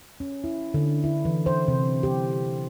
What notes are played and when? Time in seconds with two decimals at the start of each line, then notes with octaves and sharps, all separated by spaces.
0.20 C#4
0.44 E4
0.74 D3
1.04 E4
1.25 E3
1.46 C5
1.68 C3
2.03 G4